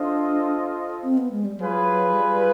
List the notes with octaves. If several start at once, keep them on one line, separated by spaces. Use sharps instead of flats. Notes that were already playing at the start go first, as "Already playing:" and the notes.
Already playing: D4 F4 A4 C5 D#5
C4
B3
G#3
G3
F#3 F4 G#4 B4
G3